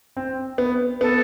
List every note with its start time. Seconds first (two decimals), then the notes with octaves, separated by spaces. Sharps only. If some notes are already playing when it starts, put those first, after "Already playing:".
0.17 C4
0.58 B3
1.01 B3 A4